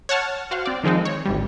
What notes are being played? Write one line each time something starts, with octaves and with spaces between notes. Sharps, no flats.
C#5 F#5 A5 F6
F#4 C5 F5 F#5
C4 D5
D#3 F3 G#3 C4 D#4
C#5
G#1 D2 G3